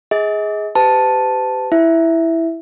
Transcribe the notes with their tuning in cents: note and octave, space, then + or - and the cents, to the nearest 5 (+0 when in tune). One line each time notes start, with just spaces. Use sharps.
G#4 +0 D#5 +40
G4 +0 B4 +45 A5 +0
E4 +0 E5 +0